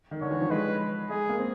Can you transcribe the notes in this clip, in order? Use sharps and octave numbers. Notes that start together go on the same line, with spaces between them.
D#3
D3 C#5
E3
F3
G#3 B4
G#3 G#4
A#3
C4